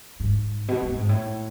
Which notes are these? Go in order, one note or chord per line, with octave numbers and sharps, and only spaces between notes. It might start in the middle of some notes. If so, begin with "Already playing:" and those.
G#2
B2
A2
G#2
A2